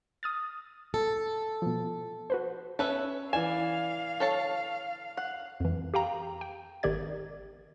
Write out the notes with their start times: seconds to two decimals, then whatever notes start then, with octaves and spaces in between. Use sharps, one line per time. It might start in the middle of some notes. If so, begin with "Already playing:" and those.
0.23 D#6 F6 A6
0.94 A4
1.62 B2 F3
2.30 F#4 B4 C5
2.79 C#4 A4 B4 E5
3.33 E3 D5 F5 G#5 E7
4.20 A4 C#5 A5
5.17 F#5
5.60 F2 E3
5.94 G4 F5 G5 A#5
6.41 G5
6.83 G#1 D#3 G4 D5 G#6